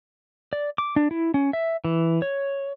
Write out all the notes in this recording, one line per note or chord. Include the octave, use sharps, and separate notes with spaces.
D5
D6
D4
E4
C#4
E5
E3
C#5